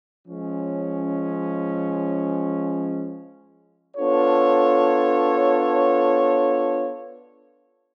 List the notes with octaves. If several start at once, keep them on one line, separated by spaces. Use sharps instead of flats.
F3 G#3 C#4
B3 D4 F4 A4 C#5